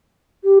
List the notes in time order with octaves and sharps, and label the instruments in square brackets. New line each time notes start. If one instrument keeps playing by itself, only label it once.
[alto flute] G4